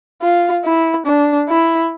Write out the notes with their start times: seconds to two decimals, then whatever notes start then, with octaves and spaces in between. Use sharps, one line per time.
0.22 F4
0.64 E4
1.06 D4
1.49 E4